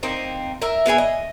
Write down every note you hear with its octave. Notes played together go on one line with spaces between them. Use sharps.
A#3 C4 D#4
A#4 E5
B3 E4 G#4 G#5
D#5